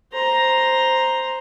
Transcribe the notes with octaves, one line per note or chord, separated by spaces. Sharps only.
C5 A#5